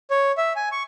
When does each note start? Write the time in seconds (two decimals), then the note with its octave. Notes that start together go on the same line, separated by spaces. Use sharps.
0.10 C#5
0.37 E5
0.56 G#5
0.72 C#6